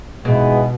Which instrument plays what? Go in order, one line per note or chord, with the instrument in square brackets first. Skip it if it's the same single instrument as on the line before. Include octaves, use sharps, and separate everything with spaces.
[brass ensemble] G#2 E3 G#3 B3 [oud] B2